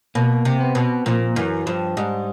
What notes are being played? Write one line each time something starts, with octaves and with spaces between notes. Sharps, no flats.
B2 A#3
C3
B3
B2
A#2 F3
F#2 E3
G2 F3
G#2 G3